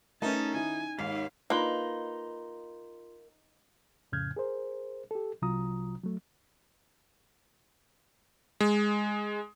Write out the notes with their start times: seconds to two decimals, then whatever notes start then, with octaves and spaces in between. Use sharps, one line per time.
0.22 A3 C#4 D#4 A#4 B4 A5
0.54 D#3 E4 G#5
0.99 D#2 G#2 F5 B6 C7
1.50 A#3 D#4 F4 B4 C6 G7
4.12 F2 A2 C#3 F6 G6 G#6
4.36 G#4 A#4 C5
5.11 G4 A4
5.42 C2 C3 F#3 F4 A#5 D#6
6.03 F#3 A3
8.60 G#3